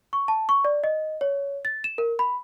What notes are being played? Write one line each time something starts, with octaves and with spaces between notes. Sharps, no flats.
C#6
A5
C#6
D5
D#5
C#5
A6
E7
A#4
B5